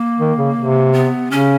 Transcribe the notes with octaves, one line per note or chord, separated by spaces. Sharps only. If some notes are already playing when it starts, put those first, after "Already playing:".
Already playing: A#3
D#3
C#3
C3
B3
C#3 C#4